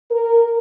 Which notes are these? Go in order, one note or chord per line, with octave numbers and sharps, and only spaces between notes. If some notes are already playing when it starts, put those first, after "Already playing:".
A#4